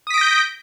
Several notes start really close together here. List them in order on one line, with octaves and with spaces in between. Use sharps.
D#6 B6 D7 A#6 G6